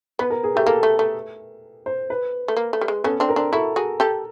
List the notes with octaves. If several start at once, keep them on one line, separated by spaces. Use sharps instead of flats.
B3 B4
A#4
G#4
A3 G4
A#3 A4
A3
A3
C5
B4
A3
A#3
A3
G3
G#3
B3 C#4 A4
C4 D4
A#4
C4 D4
E4 F#4 A4
F#4 G#4
G4 A4